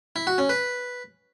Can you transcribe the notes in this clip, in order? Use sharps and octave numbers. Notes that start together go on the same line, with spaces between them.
E4
F#4
C#4
B4